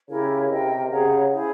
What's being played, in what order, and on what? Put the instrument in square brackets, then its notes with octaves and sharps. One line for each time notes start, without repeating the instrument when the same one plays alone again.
[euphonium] C#3 [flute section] E4 G4 A#4 C#5
[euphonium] C3 [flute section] A#4 D#5 G5
[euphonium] C#3 [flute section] G#4 C#5 F#5 A#5
[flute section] E4 G#4 C5